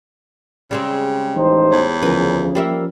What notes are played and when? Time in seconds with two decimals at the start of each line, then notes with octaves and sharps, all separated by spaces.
0.71 C#3 G3 G#3 C4
1.36 A1 E3 D#4 C5
1.72 E2 C#5
2.02 D2 C#3 F3 C#4 A#4 B4
2.55 G3 A#3 E5